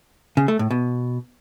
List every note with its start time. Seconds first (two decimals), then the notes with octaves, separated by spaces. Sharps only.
0.37 C#3
0.48 A3
0.59 A2
0.71 B2